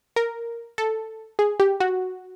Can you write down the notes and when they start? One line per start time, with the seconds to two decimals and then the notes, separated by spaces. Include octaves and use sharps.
0.16 A#4
0.78 A4
1.39 G#4
1.60 G4
1.80 F#4